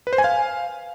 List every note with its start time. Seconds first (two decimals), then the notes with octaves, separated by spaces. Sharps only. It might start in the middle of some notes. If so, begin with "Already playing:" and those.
0.07 B4
0.13 C5
0.18 G#5
0.24 F5